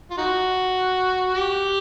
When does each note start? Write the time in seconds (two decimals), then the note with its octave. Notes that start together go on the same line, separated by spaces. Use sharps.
0.11 F4
0.18 D#4 F#4
1.35 G4